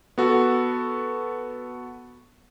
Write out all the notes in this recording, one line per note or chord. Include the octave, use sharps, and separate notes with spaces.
B3 F#4 A4